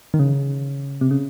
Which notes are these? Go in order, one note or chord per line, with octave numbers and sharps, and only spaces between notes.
D#3
C#3
C3
C#3